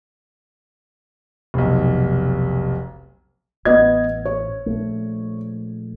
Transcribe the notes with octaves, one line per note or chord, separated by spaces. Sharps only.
F1 B1
A1 B3 D#5 G#6
C#5
A#1 A3